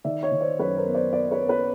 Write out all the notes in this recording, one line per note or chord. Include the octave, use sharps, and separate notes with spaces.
D#3 D5 E5
C#5 D#5
D#3
C5 D5
F#2 B4 C#5
A#4 C5
B3
C5 D5
B3 C5 D5
B4 C#5
B3
B4 C#5